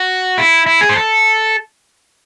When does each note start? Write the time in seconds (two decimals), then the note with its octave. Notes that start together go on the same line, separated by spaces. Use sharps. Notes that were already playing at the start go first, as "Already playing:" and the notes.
Already playing: F#4
0.38 E4
0.67 E4
0.81 G#4
0.89 C5
0.95 A4